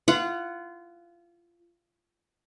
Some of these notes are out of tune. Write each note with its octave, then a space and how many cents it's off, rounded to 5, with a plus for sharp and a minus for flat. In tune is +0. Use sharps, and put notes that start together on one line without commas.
F4 -25 F#5 +0